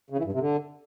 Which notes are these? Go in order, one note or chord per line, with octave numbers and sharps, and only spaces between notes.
C#3
E3
G2
C3
D3